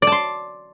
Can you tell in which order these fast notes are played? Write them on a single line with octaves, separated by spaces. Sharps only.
D5 A5 C6